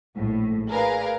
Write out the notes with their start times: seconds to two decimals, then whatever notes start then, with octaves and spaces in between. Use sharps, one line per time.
0.15 A#1 A2
0.69 G#4 A#4 B4 D5 F5